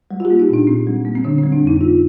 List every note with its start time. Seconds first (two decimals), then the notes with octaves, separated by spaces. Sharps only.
0.11 G3
0.20 F4
0.25 G4
0.30 A#3
0.39 D#4
0.49 A#2 D4
0.67 A#2 C4
0.87 G3
1.05 A#3
1.15 C4
1.24 D3 D4
1.38 C4
1.43 G3
1.52 D4
1.62 F2
1.67 D#4
1.81 A#3 F4